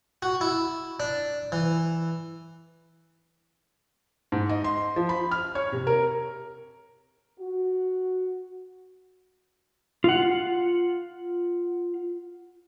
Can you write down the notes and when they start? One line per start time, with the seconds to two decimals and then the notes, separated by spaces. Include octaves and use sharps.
0.22 F#4
0.41 E4
1.00 D4
1.52 E3
4.32 G#2
4.49 D#5
4.64 C6
4.96 F3
5.09 B5
5.31 F6
5.55 C#5
5.72 C3
5.87 A#4
7.39 F#4
10.04 F4 F#5